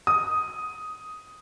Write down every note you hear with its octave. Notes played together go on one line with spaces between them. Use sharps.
D#6